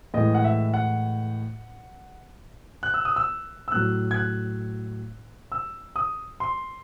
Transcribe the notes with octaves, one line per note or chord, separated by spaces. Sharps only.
A2 E3 G#3 D#5
F#5
E5
F#5
F#6
E6
D#6
E6
E6
A2 F#3 F#6
G#6
F#6
E6
D#6
C6